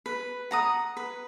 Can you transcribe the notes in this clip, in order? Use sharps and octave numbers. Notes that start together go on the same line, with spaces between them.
B4
F#5 A#5 D#6
B4